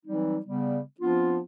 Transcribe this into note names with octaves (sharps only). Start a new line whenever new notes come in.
E3 F#3 G3 C4 D#4
C#3 G3 B3
F3 B3 C4 D4 F4